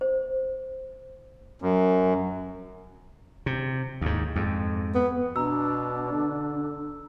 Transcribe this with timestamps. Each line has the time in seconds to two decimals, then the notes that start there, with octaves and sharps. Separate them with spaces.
0.01 C5
1.62 F#2
3.46 C3
4.01 D#2 G#2
4.36 F2 G#2
4.94 B3
5.36 B2 D4 A#5 E6
6.13 D3